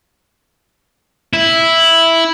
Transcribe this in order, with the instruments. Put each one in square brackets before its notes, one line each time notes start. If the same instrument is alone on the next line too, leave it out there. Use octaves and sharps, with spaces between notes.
[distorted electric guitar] E4